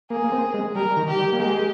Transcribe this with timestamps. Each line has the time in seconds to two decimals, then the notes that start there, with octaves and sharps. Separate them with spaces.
0.10 A#3 G#4
0.24 A#3
0.32 C4
0.54 G#3
0.75 G3 A#4
0.96 D#3
1.08 G4
1.19 G3
1.33 A#3
1.40 G#3 G4